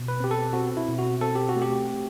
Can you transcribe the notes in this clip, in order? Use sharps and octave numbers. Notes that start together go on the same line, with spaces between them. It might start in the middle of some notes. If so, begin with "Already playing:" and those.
Already playing: B2
B4
C4 G4
A4
C4 F#4
E4
B2
F#4
C4 A4
G4
F#4
A3
G4